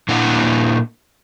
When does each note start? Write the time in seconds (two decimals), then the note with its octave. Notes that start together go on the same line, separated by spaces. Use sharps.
0.09 A#2 D4 E4 F#5